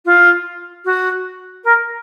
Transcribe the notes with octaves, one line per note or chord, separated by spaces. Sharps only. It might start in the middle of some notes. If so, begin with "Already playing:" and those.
F4
F#4
A#4